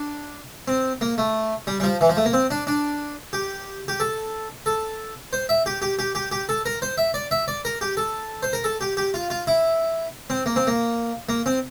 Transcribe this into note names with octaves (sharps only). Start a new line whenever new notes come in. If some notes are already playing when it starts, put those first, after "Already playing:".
Already playing: D4
C4
A#3
A3
G3
G3
F3
E3
F3
A3
A#3
C4
D4
D4
G4
G4
A4
A4
C5
E5
G4
G4
G4
G4
G4
A4
A#4
C5
E5
D5
E5
D5
A#4
G4
A4
C5
A#4
A4
G4
G4
F4
F4
E4
C4
A#3
C4
A#3
A#3
C4